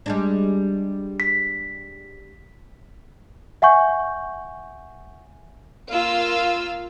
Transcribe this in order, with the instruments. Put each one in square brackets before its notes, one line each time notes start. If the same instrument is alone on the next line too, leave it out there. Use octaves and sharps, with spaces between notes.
[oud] G3 G#3 D4
[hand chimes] B6
[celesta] E5 F#5 G#5 C#6 G6
[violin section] A#3 F4 F5 E6